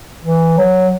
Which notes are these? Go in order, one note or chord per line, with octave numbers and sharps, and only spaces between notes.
E3
F#3